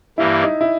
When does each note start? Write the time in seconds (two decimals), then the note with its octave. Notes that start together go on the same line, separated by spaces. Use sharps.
0.18 G2 E3 G3 A#3 E4
0.43 D#4
0.61 E4